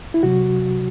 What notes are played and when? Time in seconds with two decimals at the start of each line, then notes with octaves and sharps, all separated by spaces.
0.14 E4
0.23 C3 F#3 F#4